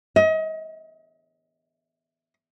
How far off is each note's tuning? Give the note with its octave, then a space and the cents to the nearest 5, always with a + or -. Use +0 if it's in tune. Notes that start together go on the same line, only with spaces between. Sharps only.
D#5 +35